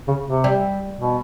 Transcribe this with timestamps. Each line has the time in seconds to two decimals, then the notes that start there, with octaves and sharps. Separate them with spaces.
0.08 C#3
0.27 C3
0.44 G3
1.00 B2